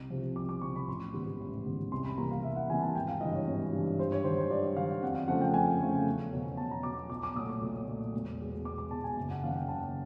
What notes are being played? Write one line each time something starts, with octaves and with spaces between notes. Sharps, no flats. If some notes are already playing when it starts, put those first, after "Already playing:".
Already playing: C2
C3 F3
C2 D6
D6
C3 F3 C#6
B5
A1 C6
G#2 D#3 G3 B3
A1
G#2 D#3 G3 B3
C2 C6
B5
C3 E3 G3 A#3 A#5
F5
C2 E5
F#5
C3 E3 G3 A#3 G#5
A5
G#1 G5
F5
G2 E3 D#5
C#5
G#1 C#5
G2 E3
G2 C5
C#5
D#3 F#3 C5
C5
G2 D5
D#3 F#3 F5
F2 F#5
F5
C#3 F3 A3 F#5
G5
F2 G#5
C#3 F3 A3
E2
B2 F#3
E2 A5
A#5
B2 F#3 D6
B1 D6
D6
A#2 F#3 A3 D#6
D6
B1
A#2 F#3 A3
E1
E2 B2 G#3 B3
E1 D6
D6
E2 B2 G#3 B3 A5
G#5
F#1
F#5
F#2 D#3 F#3 A#3 F5
F#5
G5
F#1 A5